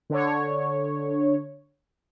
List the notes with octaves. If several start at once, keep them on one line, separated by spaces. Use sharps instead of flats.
D3 C#5